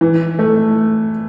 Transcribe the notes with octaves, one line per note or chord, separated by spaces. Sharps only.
E3
A3